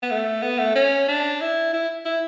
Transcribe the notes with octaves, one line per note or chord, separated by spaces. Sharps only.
B3
A3
B3
A3
C#4
D4
E4
E4
E4